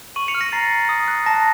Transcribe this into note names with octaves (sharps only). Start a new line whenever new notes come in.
C#6 D#7 F#7
C#7 F7
F6
A#6 C#7
A#5 A6 C7
A#5
D#6
F#6
A5 A#6